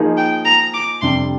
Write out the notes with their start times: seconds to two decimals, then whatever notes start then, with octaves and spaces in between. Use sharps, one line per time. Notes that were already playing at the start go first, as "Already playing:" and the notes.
Already playing: F3 A#3 D#4 G#4
0.17 G5
0.45 A#5
0.74 D6
1.01 F2 C3 G3 D4 C6